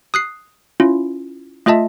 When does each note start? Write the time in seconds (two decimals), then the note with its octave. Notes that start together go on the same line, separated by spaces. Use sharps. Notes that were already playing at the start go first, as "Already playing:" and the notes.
0.14 D#6 F#6 C7
0.80 C#4 E4 F4
1.66 A3 F4 D#5 E5 A5